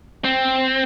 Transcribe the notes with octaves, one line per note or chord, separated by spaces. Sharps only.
C4